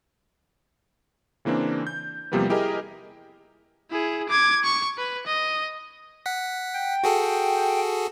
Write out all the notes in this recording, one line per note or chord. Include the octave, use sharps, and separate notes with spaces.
C#3 E3 A#3 C4 D4
G6
E2 C3 F3 G3 A#3 B3
E4 G4 G#4 A#4 D#5
E4 G#4
D6 G#6
C#6
B4
D#5
F#5 B6
G5
F#4 G#4 A4